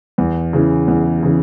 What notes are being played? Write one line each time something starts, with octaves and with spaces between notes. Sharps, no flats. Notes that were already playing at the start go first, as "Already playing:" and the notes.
E2
C#3 E3
E2
C#3 E3